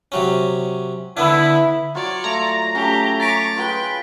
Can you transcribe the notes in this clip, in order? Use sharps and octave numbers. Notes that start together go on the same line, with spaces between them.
C3 F#3 C#4
D3 B3 D4 E4
F#3 F4 C#5 D5
A3 A#5
A3 C#4 G4
C#5 D6 A6 B6 D7
F4 G#4 B4 G5